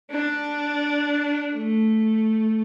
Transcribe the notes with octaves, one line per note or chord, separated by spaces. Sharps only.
D4
A3